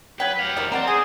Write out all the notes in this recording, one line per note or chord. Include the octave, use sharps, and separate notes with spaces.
F#3 B4 G5
G4 F5
D#3 F3 A#4
C4 D5 F#5 A#5
G#4 G#5